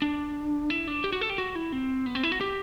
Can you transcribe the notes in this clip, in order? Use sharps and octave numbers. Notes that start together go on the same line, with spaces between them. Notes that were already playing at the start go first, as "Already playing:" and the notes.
D4
E4
D4
G4
F#4
A4
G4
F#4
E4
C4
B3
C4
E4
F#4
G4